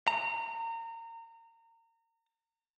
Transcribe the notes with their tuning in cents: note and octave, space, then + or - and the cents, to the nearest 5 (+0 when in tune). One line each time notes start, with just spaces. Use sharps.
A#5 -30